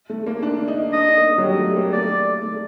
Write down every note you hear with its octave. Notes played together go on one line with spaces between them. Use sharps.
A3
A#3
D4
D#4
D4 D#5
A#3
F#3
G3
A3
A#3
A3 D5
A3